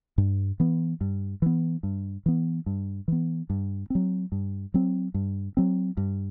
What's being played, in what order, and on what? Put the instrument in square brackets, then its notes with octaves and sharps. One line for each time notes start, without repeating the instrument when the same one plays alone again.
[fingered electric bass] G2
E3 B3
G2
E3 B3
G2
E3 B3
G2
E3 B3
G2
F#3 C4
G2
F#3 C4
G2
F#3 C4
G2